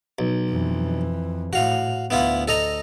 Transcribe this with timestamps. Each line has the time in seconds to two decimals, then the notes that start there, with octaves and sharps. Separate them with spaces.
0.19 B1
0.48 F2 E3
1.53 A2 F#4 F5
2.11 D2 B3 E4 F4
2.48 A4 D#5 A#5